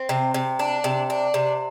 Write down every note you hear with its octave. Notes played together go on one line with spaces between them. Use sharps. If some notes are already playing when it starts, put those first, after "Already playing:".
Already playing: C4
C3
C3
D4
C3
D4
C3